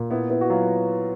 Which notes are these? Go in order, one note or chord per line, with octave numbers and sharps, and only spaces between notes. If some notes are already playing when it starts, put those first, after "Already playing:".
Already playing: A#2
B3 E4
B3 E4
F#4
F#3 F4